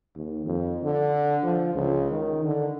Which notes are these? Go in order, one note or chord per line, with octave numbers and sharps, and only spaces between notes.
D#2
F2
D3
F3
C#2
D#3
D3